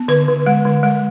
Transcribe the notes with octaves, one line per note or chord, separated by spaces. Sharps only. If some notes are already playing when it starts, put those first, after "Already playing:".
Already playing: B3
D3 B4
D3
G#3
D3
G#3